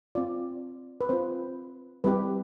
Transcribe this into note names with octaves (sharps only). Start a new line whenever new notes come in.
C4 F4 D5
B4
C4 F4 C5
G3 C4 E4 G4 B4